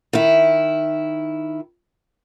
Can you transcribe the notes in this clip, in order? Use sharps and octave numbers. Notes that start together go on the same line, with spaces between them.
D#3 E4